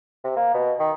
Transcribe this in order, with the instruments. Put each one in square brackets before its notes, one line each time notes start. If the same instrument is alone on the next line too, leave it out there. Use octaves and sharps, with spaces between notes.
[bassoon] C3
A#3
B2
D#3